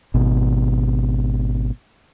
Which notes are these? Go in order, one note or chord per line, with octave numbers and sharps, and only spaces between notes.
G#1 B2